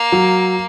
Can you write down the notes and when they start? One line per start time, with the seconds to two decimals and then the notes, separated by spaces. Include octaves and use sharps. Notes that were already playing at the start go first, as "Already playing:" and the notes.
Already playing: A#3
0.12 F#3